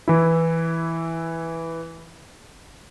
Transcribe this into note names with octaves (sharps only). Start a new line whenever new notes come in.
E3 E4